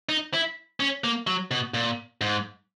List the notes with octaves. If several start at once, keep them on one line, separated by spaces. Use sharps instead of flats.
D#4
E4
C#4
A#3
F#3
B2
A#2
G#2